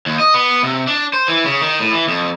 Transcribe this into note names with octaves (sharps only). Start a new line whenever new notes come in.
D#2
D#5
B3
C3
D4
C5
E3
C#3
D#3
A2
E3
F2